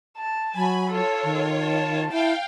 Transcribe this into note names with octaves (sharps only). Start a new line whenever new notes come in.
A5
F#3 G#5 B5
F4 A4 C#5
D#3
A5
E4 F5 G5